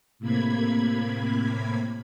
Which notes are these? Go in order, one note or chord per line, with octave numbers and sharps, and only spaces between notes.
A2 C3 A#3 B5 G#6